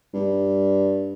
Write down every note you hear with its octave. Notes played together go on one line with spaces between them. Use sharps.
G2